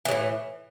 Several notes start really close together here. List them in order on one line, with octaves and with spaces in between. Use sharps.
E3 C#3 A2